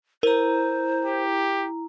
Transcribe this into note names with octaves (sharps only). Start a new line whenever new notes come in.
E4 A#4 C5 A#5
G4